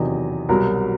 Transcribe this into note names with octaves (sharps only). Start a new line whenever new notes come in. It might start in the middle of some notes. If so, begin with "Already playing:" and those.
Already playing: E2 C3 D#3 F#3 D#5
C2 B2 F#3 A#4